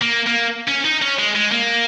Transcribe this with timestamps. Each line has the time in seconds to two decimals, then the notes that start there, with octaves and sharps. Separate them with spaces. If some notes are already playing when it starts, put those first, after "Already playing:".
0.02 A#3
0.27 A#3
0.68 C#4
0.85 D#4
1.02 C#4
1.18 G#3
1.36 G#3
1.51 A#3